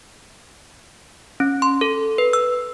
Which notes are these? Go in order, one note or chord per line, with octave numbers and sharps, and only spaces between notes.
C#4
C6
A4
B4
E6